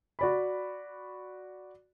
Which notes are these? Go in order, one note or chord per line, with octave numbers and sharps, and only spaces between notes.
F#4 D5 B5